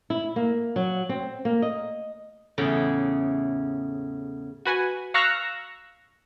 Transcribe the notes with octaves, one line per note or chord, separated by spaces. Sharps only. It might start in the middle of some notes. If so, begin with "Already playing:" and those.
E4
A#3
F#3
C4
A#3
D#5
E2 A2 C#3 G5
F#4 B4 G#5
F5 A#5 C#6 E6 F#6 A#6